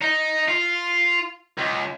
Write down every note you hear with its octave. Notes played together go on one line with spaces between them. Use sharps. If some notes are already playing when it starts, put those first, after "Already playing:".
D#4
F4
C#2